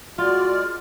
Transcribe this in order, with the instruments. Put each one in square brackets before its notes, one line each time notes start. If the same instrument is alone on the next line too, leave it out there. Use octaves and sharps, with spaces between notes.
[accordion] G#3 D5 [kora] F4 [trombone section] F#4 [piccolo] F6